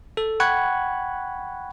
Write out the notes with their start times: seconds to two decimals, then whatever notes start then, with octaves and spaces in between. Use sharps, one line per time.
0.17 A4
0.40 F#5 G5 B5 C#6 F#6 G#6